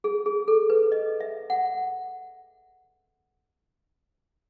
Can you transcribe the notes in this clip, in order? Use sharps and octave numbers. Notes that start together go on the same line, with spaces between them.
G#4
G#4
A4
B4
D#5
E5
F#5